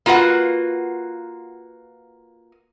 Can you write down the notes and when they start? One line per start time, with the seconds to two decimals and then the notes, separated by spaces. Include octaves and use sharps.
0.06 A#3 F4 F#4 B4 F#5